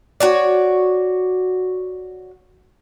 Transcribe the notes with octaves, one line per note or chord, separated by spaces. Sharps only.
F#4 C#5 D5